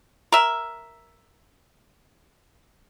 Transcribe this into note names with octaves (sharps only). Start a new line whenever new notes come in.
A#4 E5